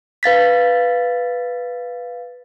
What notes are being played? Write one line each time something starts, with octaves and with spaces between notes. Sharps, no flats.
B4 F5 A6 B6